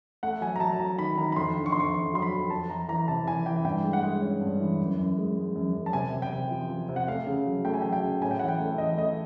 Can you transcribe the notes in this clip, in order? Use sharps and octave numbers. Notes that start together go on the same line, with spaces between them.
A3 F#5
F#3 G#5
A#5
F#3 A5
F#3 A#5
D#3 B5
D#3 A#5
B5
F2 C6
D3
C#6
F2 C6
C#6
F2 C#6
F#3 C6
B5
F2
F2 A5
F2 A#5
E3 A#5
C3 A5
E3 G#5
E3 G5
G2 G5
G#3
F#5
G#3
C#4
G2
E3
F#2
F#2
G#3
G#3
F#2
F#2
A5
C3 G#5
C3
G5
C3
F3
F3
C3
F#5
A3 F5
C#3
F#3
A3 G5
G#5
F#3 G5
G5
C#3
A2 G#5
G5
E3 F#5
G5
A3
E3 D#5
A3 D#5